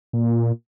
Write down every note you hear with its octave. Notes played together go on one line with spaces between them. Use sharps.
A#2